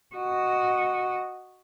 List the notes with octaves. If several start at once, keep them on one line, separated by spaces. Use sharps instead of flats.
F#4 D#5